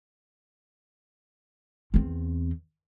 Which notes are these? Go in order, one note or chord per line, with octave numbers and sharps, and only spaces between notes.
E2 C4